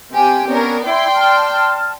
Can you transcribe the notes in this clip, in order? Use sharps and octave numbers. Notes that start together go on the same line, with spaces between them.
C3 G4 G#5
B3 C#4 D4 A#4
E4 D5 G5 C6
A5 F6